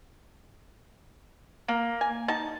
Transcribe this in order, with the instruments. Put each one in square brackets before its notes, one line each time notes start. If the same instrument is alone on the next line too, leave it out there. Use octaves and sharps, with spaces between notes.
[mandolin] A#3
[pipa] G#5
[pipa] D#4 [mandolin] A5